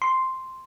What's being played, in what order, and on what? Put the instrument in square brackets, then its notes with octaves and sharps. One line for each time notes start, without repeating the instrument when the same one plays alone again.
[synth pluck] C6